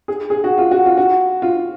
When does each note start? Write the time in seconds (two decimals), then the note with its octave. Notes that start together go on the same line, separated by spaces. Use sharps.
0.08 G#4
0.30 G#4
0.44 F#4
0.58 F4
0.71 F#4
0.86 F4
0.97 F#4
1.42 F4